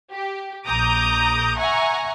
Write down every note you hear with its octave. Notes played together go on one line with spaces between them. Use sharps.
G4
A#1 A#5 D6 D#6 G6
E5 F#5 G#5 A#5 C#6